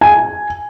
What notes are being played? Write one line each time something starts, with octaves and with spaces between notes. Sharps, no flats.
G#5